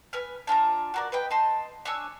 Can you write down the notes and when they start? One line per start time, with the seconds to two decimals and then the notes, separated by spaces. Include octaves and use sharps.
0.13 B4 G#5 F6
0.47 D4 F4 G#5 A#5
0.94 F#4 A#4 D5
1.12 B4 D#5 G5
1.31 D#5 A5 C6
1.85 D4 C#5 G#5 E6